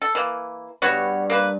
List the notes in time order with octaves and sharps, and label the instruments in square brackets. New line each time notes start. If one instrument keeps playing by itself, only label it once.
[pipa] A4
E3 A#3
[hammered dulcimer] G2 G3 [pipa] B3 F#4 C#5
[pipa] A#3 B4